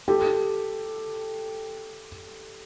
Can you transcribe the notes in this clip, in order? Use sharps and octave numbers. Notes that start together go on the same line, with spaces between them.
G4 A4